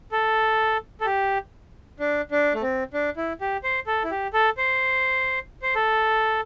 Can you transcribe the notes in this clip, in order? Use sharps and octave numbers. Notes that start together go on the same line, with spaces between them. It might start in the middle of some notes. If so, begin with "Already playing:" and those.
A4
A4
G4
D4
D4
A3
C4
D4
E4
G4
C5
A4
E4
G4
A4
C5
C5
A4